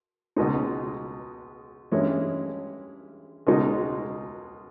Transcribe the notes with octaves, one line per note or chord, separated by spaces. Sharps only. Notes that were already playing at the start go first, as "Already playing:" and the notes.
C#2 B2 G#3 D#4
G2 E3 G#3 C#4 E4
C#2 B2 G#3 D#4